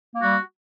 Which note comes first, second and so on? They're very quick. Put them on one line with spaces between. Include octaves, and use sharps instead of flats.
A#3 F#4 G3